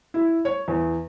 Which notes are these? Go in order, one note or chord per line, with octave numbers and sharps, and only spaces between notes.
E4
C#5
E2